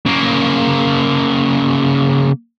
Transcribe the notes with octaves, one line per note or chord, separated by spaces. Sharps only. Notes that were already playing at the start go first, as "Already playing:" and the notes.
C#3 A#3